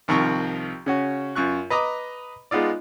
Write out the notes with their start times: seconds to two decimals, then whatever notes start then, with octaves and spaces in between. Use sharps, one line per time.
0.08 C2 D#3 F3 C4 C#6
0.86 C#3 C#4 F#4
1.36 F#2 F4 C#6 F#6
1.70 B4 D#5 A#5 D6
2.51 G#3 B3 D#4 F4 D5